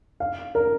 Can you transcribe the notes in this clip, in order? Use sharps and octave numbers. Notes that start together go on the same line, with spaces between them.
F5
A#4